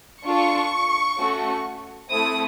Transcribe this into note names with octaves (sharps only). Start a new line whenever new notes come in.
D4 F4 A4 C#6
A3 C#4 F#4 A4
A3 C4 E4 A4 D#6